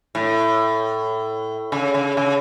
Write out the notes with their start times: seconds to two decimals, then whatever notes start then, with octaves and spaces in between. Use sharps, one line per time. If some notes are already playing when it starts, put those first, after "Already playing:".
0.15 A2
1.72 C#3
1.94 C#3
2.17 C#3